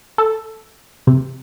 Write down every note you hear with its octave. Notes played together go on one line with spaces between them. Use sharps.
A4
C3